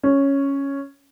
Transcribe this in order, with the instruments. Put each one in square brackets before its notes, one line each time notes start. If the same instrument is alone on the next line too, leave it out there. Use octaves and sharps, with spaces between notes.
[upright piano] C#4